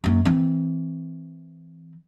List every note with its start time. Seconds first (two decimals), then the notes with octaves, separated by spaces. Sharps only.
0.04 F#2 A#3
0.25 E3 C4